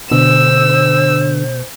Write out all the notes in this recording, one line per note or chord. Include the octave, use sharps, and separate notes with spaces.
B2 D3 C5 E6